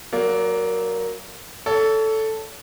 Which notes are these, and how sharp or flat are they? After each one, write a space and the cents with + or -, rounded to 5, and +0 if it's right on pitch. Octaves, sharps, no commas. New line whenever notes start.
F#3 +0 A#3 +0 D5 -35
A4 +0 C#5 +35